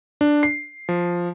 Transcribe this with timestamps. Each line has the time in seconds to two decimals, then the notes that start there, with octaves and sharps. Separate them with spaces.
0.21 D4
0.43 C7
0.89 F3